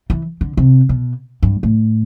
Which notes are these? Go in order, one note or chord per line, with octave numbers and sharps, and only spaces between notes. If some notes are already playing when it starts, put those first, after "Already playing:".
E3
D3
C3
B2
G2
A2